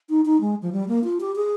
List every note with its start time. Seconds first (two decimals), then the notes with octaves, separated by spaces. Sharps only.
0.09 D#4
0.25 D#4
0.41 G#3
0.62 F3
0.72 G3
0.88 A#3
1.04 F4
1.21 G4
1.36 G#4